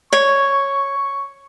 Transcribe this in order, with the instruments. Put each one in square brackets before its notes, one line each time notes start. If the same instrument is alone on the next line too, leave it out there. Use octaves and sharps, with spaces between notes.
[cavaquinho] C#5 [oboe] C#6